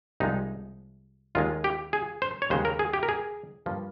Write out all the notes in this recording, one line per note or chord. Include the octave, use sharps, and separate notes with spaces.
C2 C3 F3 G#3 D#4
D#2 D#3 G#3 F4
G4
G#4
C5
C#5
D#2 C#3 G#3 C5
A#4
G#4
G4
A#4
G#4
G2 F3 A#3